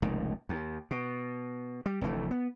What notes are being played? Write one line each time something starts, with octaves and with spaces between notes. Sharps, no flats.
F1 C#2 A#2 D#3
D#2
B2
G3
F1 D2 E3 A3
B3